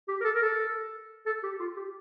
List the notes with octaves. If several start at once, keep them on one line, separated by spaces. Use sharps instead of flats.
G4
A#4
A4
A#4
A4
A4
G4
F4
G4